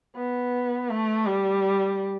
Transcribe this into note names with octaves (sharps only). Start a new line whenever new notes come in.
B3
A3
G3